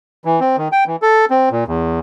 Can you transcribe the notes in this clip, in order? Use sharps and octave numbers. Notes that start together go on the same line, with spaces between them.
E3
C4
D#3
G5
E3
A4
C4
A#2
E2